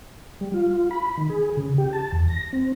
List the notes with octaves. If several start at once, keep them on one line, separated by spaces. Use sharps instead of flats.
G3
F4
B5
D#3
G#4
C#3
G4
A5
E2
A#6
C4